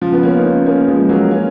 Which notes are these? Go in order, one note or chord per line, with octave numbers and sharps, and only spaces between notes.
C#3 F3
B3
A#3 C#4
D#4
A#3 C#4
A#3 C#4
F3 G#3
F#3 A#3
A#3 C#4